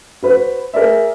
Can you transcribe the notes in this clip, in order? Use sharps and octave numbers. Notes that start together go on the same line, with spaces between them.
F#4 B4 C5
G#4 A#4 D5 E5